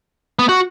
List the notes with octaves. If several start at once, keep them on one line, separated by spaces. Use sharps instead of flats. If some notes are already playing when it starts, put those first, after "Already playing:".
B3
F#4